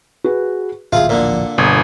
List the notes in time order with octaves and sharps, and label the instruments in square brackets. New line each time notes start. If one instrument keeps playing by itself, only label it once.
[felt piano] F#4 G#4 B4
[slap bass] D1 A#1 F3 [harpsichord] F4 G#4 [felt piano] E5
[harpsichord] A#2 D3 [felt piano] D5
[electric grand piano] G1 [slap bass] B2 [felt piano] D#6